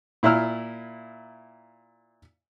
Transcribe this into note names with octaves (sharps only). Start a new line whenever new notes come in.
A#2 E4 A#5 E6 F6